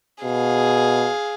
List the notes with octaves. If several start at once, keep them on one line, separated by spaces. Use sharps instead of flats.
B2 G#4 F5